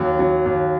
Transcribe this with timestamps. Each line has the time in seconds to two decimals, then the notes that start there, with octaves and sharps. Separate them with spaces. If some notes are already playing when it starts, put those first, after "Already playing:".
Already playing: D#2 F#3
0.19 F#3
0.45 D#2